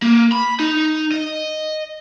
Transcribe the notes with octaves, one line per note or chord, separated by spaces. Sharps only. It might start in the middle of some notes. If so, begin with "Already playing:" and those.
A#3
B5
D#4
D#5